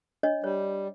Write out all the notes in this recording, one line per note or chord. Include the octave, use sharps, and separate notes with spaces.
D4 C#5 D#5
G3 C#5